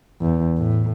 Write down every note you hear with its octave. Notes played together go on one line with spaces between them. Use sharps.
E2
A2